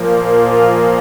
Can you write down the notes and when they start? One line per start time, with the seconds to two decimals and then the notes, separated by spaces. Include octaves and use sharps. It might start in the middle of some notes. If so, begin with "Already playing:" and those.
Already playing: A#2 F3 A#3
0.41 F4